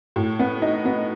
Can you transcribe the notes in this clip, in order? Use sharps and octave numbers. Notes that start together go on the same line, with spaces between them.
A2
B3
D#4
B3